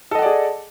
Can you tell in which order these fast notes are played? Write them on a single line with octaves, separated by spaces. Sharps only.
A4 D#5 F#5 D5 G#4